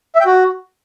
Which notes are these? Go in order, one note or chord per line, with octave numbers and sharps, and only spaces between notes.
E5
G5
F#4